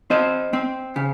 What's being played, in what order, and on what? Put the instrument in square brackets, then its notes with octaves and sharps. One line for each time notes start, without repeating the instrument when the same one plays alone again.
[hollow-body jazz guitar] C4 C5 D#5
C4
C#3